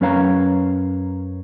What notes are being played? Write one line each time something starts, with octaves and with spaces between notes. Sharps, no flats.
F#2 C#4 B4 C#5 F5 A#5